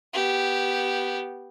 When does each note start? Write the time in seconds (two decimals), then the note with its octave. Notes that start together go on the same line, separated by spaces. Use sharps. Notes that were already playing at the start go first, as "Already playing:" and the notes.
0.14 B3 G4